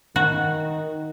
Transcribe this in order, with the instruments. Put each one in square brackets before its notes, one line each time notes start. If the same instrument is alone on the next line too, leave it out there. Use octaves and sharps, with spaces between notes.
[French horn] D#3 [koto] F#4